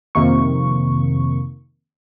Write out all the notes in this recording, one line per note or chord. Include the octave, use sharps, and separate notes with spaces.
F2 C3 D#3 A#3 C#6